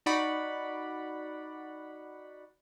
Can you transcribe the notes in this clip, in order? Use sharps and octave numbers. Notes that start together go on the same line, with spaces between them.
D#4 F#4 D5 F#5 B5